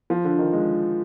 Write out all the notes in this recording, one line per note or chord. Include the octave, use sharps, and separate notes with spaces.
F3
D3
D#3
G#3